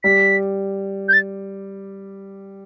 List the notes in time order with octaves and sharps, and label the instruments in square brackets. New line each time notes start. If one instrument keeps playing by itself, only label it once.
[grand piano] G3 [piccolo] B6
[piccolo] G6
A6